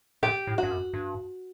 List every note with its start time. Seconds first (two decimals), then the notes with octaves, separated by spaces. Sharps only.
0.23 A#2 G4
0.47 A2
0.58 F#4
0.63 G2
0.71 F#2
0.94 G2